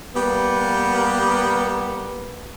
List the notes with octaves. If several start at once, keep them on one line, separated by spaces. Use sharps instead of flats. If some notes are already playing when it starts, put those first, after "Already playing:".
G3 A#3 B3